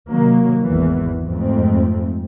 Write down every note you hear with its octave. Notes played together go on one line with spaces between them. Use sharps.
C3 D#3 F#3 A#3
G#1 E2 E3
F2 G#2 A3 C4